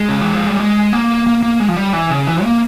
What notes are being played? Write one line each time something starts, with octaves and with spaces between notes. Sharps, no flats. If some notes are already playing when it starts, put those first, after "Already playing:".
Already playing: G#3
C#3
E3
F3
G3
G#3
A#3
A#3
A#3
G#3
F3
G3
E3
C#3
E3
A#3